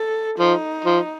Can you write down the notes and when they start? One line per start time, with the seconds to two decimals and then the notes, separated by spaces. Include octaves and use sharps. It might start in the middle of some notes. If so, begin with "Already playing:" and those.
Already playing: A4
0.39 F3 D#4
0.85 F3